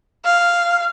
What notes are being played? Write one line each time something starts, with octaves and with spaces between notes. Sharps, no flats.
F5